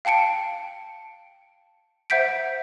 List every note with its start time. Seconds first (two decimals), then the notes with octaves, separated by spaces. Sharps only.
0.05 F5 G5 A5 C#7 D7
2.10 C5 E5 F#5 G6 B6 D7